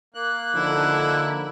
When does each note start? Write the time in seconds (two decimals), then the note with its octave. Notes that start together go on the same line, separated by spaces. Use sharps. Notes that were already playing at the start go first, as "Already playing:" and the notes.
0.14 A#3 F#6
0.55 D3 F3 D#4 E4 A4